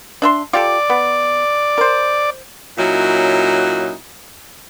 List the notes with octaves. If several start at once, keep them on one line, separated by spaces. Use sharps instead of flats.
D4 E5 C6
F4 G4 A4 D5
B3
A#4 C5
A#2 F#3 C#4 D#4 E4 F#4